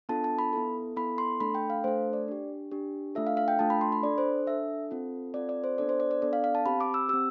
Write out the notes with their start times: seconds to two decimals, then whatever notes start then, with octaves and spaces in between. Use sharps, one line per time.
0.09 B3 D4 F4 A4 A5
0.24 A5
0.39 B5
0.53 B3 E4 A4
0.96 B3 E4 A4 B5
1.18 C6
1.40 A3 D4 A4 B5
1.55 G5
1.70 F5
1.84 A3 D4 A4 C5
2.13 D5
2.28 D4 G4
2.71 D4 G4
3.15 A3 D4 F4 A4 E5
3.27 F5
3.37 F5
3.48 G5
3.59 A3 D4 F4 A4 A5
3.70 B5
3.81 C6
3.92 B5
4.03 D4 A4 D5
4.18 C5
4.47 D4 A4 E5
4.91 C4 F4 A4
5.34 C4 F4 A4 D5
5.49 D5
5.64 C5
5.78 B3 D4 A4 D5
5.89 C5
6.00 D5
6.11 D5
6.22 B3 D4 A4 D5
6.33 F5
6.44 F5
6.55 A5
6.66 C4 G4 B5
6.81 D6
6.94 E6
7.09 G4 E6
7.13 C4